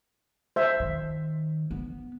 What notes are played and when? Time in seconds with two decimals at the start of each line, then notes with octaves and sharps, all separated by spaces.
0.56 C5 E5
0.80 D#3
1.71 B3